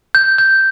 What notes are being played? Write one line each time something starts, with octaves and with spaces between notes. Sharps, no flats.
G6
G6